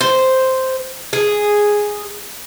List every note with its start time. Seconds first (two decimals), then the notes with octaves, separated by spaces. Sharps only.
0.01 C5
1.13 G#4